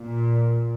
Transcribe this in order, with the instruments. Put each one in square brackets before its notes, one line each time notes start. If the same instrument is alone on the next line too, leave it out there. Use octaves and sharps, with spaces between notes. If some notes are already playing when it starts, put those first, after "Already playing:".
Already playing: [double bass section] A#2